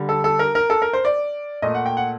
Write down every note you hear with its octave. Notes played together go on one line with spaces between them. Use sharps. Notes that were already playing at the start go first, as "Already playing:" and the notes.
Already playing: D3 G3
A4
A4
A#4
A#4
A4
A#4
C5
D5
A#2 A3 D#5
F#5
G5
F#5